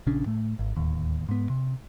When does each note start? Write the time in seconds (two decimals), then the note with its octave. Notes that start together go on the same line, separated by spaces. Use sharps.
0.07 A#1 C#3 C#4 D4
0.26 A2 A3
0.59 G#1
0.76 D1 D#2
1.29 G#2 B3
1.50 C3